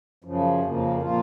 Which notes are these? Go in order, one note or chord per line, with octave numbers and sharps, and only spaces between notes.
F#2 C#3 F3
F2 C#3 F3 A#3
A#2 F3 A#3 F4